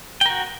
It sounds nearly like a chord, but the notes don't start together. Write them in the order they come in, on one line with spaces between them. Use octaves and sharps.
G5 A#4 F#4